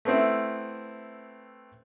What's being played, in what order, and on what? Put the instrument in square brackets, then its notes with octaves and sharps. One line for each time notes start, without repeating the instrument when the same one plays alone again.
[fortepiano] A3 B3 C4 E4